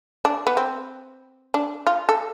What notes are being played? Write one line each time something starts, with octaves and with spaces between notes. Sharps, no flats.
D4
B3
C4
D4
F4
A4